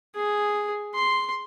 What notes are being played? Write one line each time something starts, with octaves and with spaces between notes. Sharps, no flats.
G#4
C6